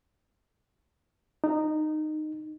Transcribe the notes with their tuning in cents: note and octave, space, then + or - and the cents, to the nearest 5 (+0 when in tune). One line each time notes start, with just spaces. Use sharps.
D#4 -15